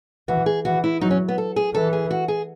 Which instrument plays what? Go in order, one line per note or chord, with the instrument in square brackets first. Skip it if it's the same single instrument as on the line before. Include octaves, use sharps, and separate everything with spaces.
[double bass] E3 [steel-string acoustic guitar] F#4
[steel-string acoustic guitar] G#4
[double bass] E3 [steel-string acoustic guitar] F#4
[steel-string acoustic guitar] E4
[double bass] F#3 [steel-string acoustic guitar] D#4
[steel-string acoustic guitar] C#4
B3
A4
G#4
[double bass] E3 [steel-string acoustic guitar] A4
[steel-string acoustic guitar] G#4
F#4
G#4